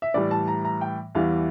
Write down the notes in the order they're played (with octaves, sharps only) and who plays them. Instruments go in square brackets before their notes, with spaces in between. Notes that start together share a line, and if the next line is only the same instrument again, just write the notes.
[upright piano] E5
A2 E3 G3 D5
A5
A#5
A#5
G5
E2 E3 G3 F5